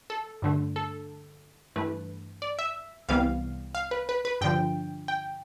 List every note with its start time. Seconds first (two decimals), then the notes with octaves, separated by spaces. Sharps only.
0.10 A4
0.42 G2 D3 A3
0.76 A4
1.76 G2 E3 A3 B4
2.42 D5
2.59 E5
3.08 C2 C3 E3 G3 B3 F5
3.75 F5
3.91 B4
4.09 B4
4.25 B4
4.41 G2 D3 F3 G5
5.08 G5